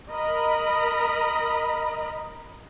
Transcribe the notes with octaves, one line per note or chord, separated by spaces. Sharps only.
A#4 D#5 A#5 B5